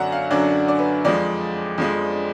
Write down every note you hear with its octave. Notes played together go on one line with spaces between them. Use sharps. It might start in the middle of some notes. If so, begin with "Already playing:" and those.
Already playing: F#2 D3 F#3 D4 F#5 A#5
F5
F#2 D3 F#3 D4 D5
D5
B4
F2 F3 G#3 D5
F2 F3 G#3